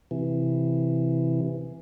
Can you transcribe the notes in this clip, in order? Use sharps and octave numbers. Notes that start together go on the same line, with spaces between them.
C3 E3